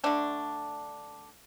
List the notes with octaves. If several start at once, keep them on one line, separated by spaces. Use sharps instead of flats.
D3 A3 D4